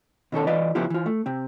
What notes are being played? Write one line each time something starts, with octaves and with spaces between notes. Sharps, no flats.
B2 D#3 C#4 A4
E3 F4 B4 D5 D#5
C#3 F3 B3 E4 F4 G4
E3 F4
A3
C3 C4